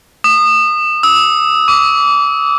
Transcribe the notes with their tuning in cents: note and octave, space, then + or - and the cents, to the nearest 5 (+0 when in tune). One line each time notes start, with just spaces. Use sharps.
D#6 -30
E6 -30
D6 -30